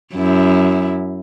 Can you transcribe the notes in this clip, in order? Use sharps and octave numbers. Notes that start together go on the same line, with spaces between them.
F#2 E4